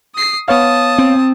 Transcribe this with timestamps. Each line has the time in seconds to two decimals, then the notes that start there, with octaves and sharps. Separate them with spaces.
0.15 D#6 C7
0.48 B3 C#5 F5 A5 D#6
0.98 C4